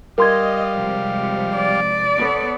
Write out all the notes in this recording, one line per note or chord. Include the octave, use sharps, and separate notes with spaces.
G3 A#4 D#5 F5 C6 G#6
C3 F3 G#3
D5
B3 A4 C#5